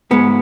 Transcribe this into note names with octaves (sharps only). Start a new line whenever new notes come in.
G#2 G#3 B3